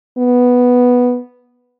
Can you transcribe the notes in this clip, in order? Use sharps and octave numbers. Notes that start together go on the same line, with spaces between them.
B3